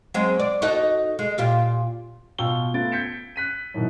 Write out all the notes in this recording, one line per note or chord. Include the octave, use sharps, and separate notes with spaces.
F#3 G#3 C4
D5
D#4 F#4 A4
G#3
A#2 F4 G4
B2 F4 G5 C#6 E6 G7
A3 B3 F4 A6 D7
G6 G#6 B6 C#7 D7 E7
F#6 B6 D#7
B2 D#3 E3 F#3